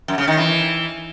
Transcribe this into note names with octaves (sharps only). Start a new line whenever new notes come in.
F#2
C#3
D#3
E3